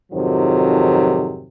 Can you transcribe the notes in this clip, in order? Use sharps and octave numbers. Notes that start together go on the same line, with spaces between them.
F2 G#2 C3 D#3 F3 F#3